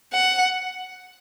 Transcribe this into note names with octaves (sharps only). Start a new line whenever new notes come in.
F#5